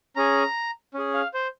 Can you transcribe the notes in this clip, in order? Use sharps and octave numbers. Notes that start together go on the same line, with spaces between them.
C#4 G#4 A#5
C#4 G#4
F5
C5